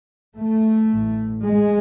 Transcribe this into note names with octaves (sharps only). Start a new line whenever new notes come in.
A3
A1 A2
G#3